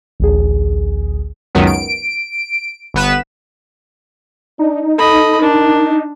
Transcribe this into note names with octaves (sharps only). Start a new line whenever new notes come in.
A1 D2 G#4
C#2 F#2 D#3 F#3 B3
D7
G1 B3 B4 E7
D4 D#4
A4 D#5 B5
D4 A#4